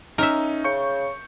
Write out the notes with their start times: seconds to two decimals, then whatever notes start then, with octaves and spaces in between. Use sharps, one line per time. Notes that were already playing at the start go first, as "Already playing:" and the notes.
0.18 C#4 D#4 A#4 E5
0.64 C#3 C#6 G6 C#7